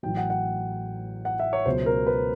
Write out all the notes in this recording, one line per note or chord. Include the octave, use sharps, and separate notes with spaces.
A1 A2 F#3 G5
F#5
F#5
F#5
E5
C#5
C#2 B2 F#3 C5
A#4
B4